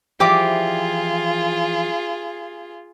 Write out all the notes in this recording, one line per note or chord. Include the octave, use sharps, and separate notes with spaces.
E3 F3 F4 G4 G#4 D5 D6